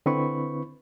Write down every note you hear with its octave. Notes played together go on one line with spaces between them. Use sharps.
D3 C4 E4 B4 B5 C#6